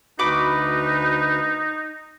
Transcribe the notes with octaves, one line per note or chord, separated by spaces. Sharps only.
D2 D#4 F#4 B4 B5 D6